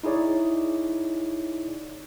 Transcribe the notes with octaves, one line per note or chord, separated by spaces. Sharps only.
D#4 E4 G#4 C#5 D5